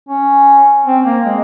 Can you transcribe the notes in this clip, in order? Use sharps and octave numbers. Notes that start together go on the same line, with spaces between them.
C#4
C4
A#3
G#3